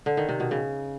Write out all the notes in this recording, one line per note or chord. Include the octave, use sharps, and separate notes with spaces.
D3
D#3
C3
B2
C#3